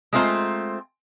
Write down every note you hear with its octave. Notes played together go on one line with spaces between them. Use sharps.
G#3 A3 C4 F4 C5 A#5